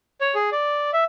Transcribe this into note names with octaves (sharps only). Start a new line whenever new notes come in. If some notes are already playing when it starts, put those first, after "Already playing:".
C#5
G#4
D5
E5